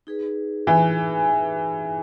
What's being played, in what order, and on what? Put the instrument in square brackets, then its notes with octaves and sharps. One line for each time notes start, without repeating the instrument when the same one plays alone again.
[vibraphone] D#4 G#4 B4
[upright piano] E3